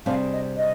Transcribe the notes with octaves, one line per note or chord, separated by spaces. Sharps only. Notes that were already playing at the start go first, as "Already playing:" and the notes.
C3 G3 D4 G#4 F5
D#5
D#5